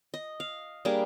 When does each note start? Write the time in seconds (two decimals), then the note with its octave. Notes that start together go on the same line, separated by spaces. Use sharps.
0.14 D#5
0.40 F5
0.85 G3 A#3 D4 G#4